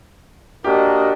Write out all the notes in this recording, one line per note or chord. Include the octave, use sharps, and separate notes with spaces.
A#3 D4 F#4 G4 A#4 D#5